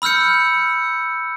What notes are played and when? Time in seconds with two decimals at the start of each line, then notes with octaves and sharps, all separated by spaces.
0.02 B5 E6 F6 G6 C#7